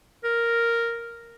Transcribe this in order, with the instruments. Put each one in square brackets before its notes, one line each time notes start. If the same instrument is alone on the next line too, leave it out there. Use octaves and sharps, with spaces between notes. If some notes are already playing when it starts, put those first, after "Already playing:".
[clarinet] A#4